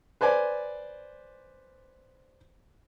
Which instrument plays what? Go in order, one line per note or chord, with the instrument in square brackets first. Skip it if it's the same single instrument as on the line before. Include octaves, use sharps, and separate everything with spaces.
[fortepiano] B4 C5 D5 G#5